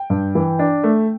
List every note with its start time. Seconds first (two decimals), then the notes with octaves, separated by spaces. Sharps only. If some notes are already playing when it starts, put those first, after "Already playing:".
Already playing: G5
0.10 G2
0.35 E3
0.59 D4
0.84 A3